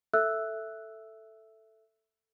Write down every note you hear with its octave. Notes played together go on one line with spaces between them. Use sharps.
A4 E5 E6 F#6